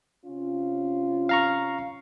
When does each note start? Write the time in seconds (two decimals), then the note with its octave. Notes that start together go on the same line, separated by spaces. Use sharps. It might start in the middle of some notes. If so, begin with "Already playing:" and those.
0.25 C3 C#4 F4
1.29 F5 A#5 C#6